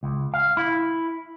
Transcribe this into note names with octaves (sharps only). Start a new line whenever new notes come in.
C#2
F5
E4